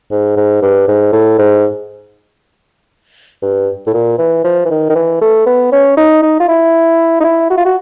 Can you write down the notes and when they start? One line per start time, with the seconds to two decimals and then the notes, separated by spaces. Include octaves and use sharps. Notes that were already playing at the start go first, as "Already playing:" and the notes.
0.11 G#2
0.37 G#2
0.62 G2
0.88 G#2
1.13 A2
1.39 G#2
3.42 G2
3.87 A2
3.94 A#2
4.18 E3
4.44 F3
4.65 E3
4.70 D#3
4.90 D#3
4.95 E3
5.21 A3
5.46 B3
5.72 C#4
5.97 D#4
6.22 D#4
6.40 F4
6.48 E4
7.20 D#4
7.24 E4
7.50 F#4
7.57 F4
7.65 F#4